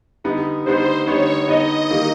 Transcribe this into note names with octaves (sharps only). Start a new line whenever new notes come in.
D3 G3 B3 D#4
D3 G3 B3 D#4 C5
D3 G3 B3 D#4 C#5
D3 G3 B3 D#4 D#5
D#3 G3 A#3 D#4